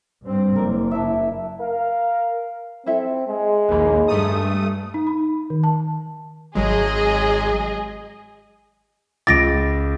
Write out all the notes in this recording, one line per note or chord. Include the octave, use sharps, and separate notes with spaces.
G2 C4
F#1 A#4 D5
D4 E4 E5
A#4 F5
C4 E4 A4 E5
G#3
A#1 D#2 A#3 B4 B5
G2 A3 A#4 A#5 D#6
D#4
B5
D#3
A5
G#1 F#3 G#3 G#4 D#5
C#2 D6 A6 A#6 D7